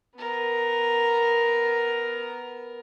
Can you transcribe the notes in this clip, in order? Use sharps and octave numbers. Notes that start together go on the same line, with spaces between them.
B3 A#4